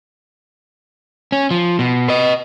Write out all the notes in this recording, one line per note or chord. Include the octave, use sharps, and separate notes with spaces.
C#4
F3
B2
B4 D#5